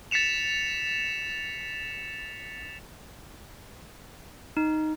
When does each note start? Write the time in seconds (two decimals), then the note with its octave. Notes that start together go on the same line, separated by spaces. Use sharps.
0.11 A6 B6 C#7 E7 F7
4.57 D#4